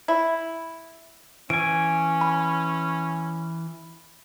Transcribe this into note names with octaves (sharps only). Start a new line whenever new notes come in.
E4
E3 C#4 G#5 D7
B5